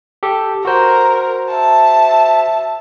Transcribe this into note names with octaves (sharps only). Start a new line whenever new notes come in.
G4 A4
F#4 A#4 C5
E5 A5